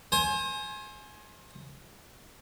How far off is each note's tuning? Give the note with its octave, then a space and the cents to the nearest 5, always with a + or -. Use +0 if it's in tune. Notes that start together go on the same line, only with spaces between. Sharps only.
C5 +35 G#5 +20